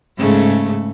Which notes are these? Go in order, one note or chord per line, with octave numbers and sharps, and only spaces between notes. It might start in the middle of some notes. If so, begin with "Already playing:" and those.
G#2 C#3 A3